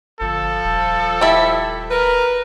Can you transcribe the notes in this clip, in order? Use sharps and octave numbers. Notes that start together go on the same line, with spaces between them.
G1 F3 A4
D#1
E4 G4
A#4 B4